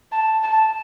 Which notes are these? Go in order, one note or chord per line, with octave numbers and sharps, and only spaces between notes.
A5
A5